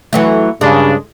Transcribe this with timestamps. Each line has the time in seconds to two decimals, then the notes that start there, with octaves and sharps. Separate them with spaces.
0.13 E3 F#3 A3
0.61 G2 C#3 G#3 D4